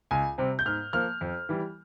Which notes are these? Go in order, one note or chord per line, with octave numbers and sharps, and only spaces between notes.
C#2 G#5
C3 G3 C4
G6
G#2 F6
F3 A#3 F6
F2
E3 G3